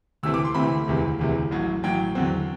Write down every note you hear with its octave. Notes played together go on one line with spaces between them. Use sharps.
D2 C3 E3 A3 C4 E6
D6
C6
D2 C3 E3 A3 C4 B5
E1 D2 C3 E3
E1 D2 C3 E3
A1 A2 F#3
A1 A2 F#3 G5
E2 D3 F#3 C4